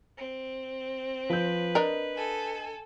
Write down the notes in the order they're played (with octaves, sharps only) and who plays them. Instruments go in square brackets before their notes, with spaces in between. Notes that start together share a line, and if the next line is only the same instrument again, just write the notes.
[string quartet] C4
[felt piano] F3 G6 [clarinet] B4
[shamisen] D4 A#4 [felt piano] D#5
[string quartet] A4 G#5